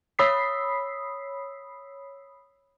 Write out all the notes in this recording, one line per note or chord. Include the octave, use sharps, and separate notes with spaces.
C#5 B5 D#6 E6 B6 C7